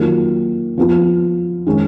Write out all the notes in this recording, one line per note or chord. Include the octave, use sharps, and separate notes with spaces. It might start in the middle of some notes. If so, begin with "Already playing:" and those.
Already playing: D#3 F#3 A#3 F4
F3 B3 F4
D#3 G#3 C#4